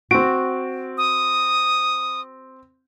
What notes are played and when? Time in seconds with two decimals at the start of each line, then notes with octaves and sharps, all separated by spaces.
0.11 C4 F#4 D7
0.98 D#6